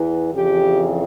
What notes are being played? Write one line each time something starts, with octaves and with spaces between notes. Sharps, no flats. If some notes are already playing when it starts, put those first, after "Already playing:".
Already playing: E2 E3
F2 C#3 E3 G4